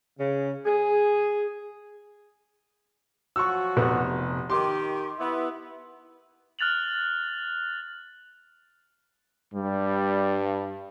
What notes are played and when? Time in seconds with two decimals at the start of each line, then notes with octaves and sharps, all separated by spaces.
0.18 C#3
0.65 G#4
3.36 F3 F#3 F#4 C#6 E6
3.77 F1 C3 B3
4.50 D#3 G4 C6 D6
5.19 B3 E4
6.59 F6 F#6 A6 F7 F#7
9.54 G2 G3